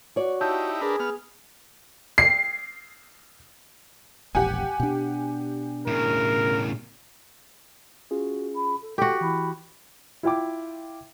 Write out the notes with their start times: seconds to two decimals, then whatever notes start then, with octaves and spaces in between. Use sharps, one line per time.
0.16 F#4 C#5 D5
0.41 D#4 E4 G4 A5 E6 G6
0.82 D4 G#4 A#4 B4
1.00 B3 F6
2.18 C7
4.35 E1 A#1 G4 F#5 G#5
4.80 B2 D4
5.87 A2 C#3 A#4
8.11 C#4 F4 F#4 G#4
8.54 B5
8.82 A4
8.98 F#4 G4 A4 G5
9.21 E3 E4 B5
10.23 E4 F4 G5 D6